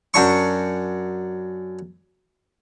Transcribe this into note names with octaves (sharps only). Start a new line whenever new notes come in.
F#2 D4 C#6